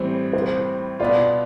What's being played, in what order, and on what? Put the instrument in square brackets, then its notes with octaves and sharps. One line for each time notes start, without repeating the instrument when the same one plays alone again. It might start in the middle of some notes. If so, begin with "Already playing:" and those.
Already playing: [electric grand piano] A2 E3 G3 C4 [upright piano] C5
[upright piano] C5
[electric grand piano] B2 B3 F4 [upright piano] D5